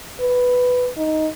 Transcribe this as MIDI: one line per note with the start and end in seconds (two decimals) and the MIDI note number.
0.21 0.89 71
0.97 1.28 63